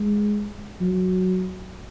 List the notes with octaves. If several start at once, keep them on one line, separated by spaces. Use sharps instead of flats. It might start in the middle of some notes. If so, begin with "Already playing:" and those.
Already playing: G#3
F#3